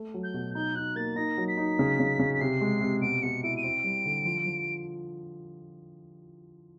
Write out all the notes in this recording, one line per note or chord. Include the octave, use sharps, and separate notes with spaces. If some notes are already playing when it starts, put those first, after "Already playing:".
Already playing: A3
F#3
G6
B2
D#4 G6
D#4 F#6
A#3 A6
D#4 A#6
F#3
B6
D#4
C#3
C#3
C#3
B6
C3 C7
G#3
C3
B2 D7
B2 C#7
E4 D7
D#7
C4 D7
G3
D3
F3
F3